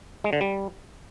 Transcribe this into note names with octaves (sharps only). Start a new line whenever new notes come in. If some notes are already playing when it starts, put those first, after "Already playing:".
G#3
D3
G3